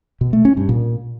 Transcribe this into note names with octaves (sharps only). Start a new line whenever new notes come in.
B2
A3
C#4
G2
A#2